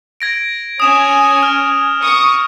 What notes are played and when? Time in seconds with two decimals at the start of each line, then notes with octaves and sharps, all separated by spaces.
0.20 G#6 A#6 D7
0.80 C#4 G#5 D#6 E7 F7
1.43 F6
2.02 C#6 D#6